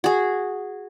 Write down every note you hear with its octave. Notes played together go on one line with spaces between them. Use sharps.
F#4 G#4